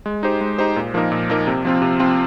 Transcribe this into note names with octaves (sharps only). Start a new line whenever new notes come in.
G#3
D#4 G4 C5
G#3
D#4 G4 C5
A#2
F3 A#3 D#4 A#4
A#2
F3 A#3 D#4 A#4
C3
F3 C4 F4
C3
F3 C4 F4